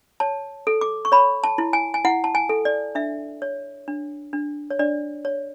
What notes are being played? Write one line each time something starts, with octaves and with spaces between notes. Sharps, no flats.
C#5 A5
A4
D6
C#6
C#5 B5
A5
E4
G#5
G#5
E4 F#5
A5
G#5
A4
D5
D4 E5
C#5
D4
D4
C#5
D4 D5
C#5